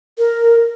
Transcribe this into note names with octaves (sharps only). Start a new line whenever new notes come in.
A#4